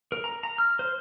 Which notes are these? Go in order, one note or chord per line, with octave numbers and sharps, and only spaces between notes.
A#4
A#5
A#5
F6
C5